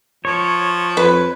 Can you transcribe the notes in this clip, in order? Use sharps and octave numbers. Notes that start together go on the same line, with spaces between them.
F3 C#5
F2 B4